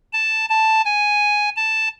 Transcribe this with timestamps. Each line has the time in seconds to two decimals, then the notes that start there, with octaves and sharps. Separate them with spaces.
0.13 A5
0.49 A5
0.85 G#5
1.56 A5